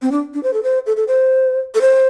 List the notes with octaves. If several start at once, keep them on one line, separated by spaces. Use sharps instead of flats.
C4
D4
D4
C5
A4
C5
A4
A4
C5
A4
C5